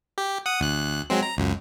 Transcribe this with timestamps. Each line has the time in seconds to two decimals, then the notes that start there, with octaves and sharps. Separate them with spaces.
0.18 G4
0.46 F#5 D#6
0.60 D2 F#6
1.10 F#3 G#3 C4
1.22 A#5
1.37 C#2 F#2